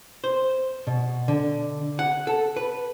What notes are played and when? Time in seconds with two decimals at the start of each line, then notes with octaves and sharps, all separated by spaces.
0.24 C5
0.87 B2
1.28 D3
1.99 F#5
2.27 A4
2.56 B4